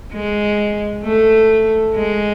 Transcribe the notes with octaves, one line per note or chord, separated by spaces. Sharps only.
G#3
A3
G#3